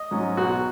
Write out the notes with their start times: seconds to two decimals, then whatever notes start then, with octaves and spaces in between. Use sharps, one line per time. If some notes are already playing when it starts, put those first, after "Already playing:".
Already playing: D#5
0.11 G#2 F#3 C#4
0.37 B1 F#4